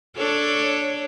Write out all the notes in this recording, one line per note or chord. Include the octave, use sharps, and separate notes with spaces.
D4 A4 C#5